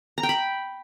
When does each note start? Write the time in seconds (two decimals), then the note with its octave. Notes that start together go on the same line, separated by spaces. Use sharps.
0.18 A#5
0.23 G5
0.29 B5